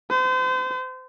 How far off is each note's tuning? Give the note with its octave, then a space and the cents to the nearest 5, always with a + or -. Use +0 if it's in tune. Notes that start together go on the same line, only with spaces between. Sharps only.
C5 -35